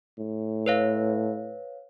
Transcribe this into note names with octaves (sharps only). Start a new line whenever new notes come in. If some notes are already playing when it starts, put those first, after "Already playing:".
A2
B4 C#5 F5